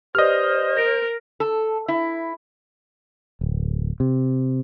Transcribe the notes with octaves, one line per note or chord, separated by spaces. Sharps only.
G4 B4 C5 D5 D#5 F6
A#4 A#6 D7
A4
E4
D1
C3